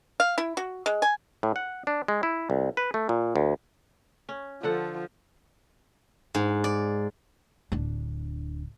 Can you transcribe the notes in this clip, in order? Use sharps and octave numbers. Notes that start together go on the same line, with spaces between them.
F5
E4
F#4
G#3
G#5
A2
F#5
D4
G#3
E4
C2
B4
A3
A#2
D2
C#4
D3 F3 A4 F#5
G#2
D5
D1 D4